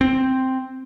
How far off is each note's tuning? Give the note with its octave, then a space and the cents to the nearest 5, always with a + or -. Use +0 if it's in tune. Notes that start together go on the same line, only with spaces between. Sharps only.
C4 +0